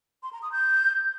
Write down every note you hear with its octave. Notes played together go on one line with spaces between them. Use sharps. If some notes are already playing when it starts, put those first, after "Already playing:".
C6
A#5
D#6
G6